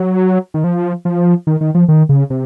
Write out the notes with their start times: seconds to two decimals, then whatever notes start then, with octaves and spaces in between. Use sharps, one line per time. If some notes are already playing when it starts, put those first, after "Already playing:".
Already playing: F#3
0.54 D#3
0.64 F3
1.05 F3
1.47 D#3
1.61 D#3
1.75 F3
1.88 D#3
2.09 C#3
2.30 C3